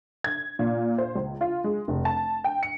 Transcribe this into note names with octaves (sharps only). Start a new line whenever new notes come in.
G#6
A#2
C5
C#2
F4
G#3
F1
A5
G5
C#7